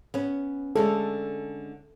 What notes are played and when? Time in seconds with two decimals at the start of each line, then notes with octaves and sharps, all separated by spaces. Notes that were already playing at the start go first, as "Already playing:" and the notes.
0.14 B3 C#4
0.76 D3 G#3 C#4 A4